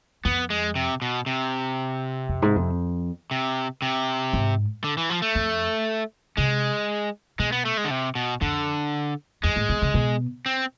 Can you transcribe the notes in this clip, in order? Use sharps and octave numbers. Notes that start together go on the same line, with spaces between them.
F2 B3
G#3
C3
B2
C3
F2
G#2
F2
C3
C3
G#2
D3
E3
F3
A3
F2
C3 G#3
B2 G#3
B3
A3
G#3
D3
C3
B2
F2 D3
F2 G#3
A2
B2
C3
B2
C4